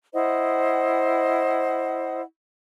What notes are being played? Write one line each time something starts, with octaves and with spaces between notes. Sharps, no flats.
E4 C5 D#5 F#5